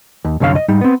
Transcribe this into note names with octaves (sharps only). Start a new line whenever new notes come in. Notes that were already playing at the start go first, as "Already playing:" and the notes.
D#2
C2 F#2 D3 C#5 F5
D#5
G#2 G3 D#4
B3 C4